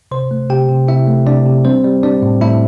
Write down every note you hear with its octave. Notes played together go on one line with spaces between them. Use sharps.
C3 C5 C6
A3
C3 G4 G5
C3
C3 E4 E5
A3
C3 D4 D5
C3
G3 C4 C5
G3
G3 D4 D5
A2
A2 E4 E5